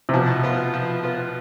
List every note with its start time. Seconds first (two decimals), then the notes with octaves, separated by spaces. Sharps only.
0.09 C3
0.14 B2 F3
0.44 B3 F4
0.74 F3
1.04 B3 F4